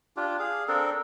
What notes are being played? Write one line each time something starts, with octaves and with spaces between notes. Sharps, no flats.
D4 F4 G4
G#4 F5
C4 D4 A4 A#4